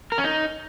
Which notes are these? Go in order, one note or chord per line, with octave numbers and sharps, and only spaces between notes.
A#4
C#4
D#4